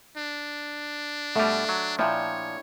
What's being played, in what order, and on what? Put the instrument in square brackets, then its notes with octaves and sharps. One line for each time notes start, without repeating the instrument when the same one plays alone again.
[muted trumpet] D4
[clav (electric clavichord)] B2 G3 [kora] A3
[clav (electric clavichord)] F#3
[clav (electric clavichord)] A#2 F3 [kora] D4 E4 G5 [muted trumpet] C#5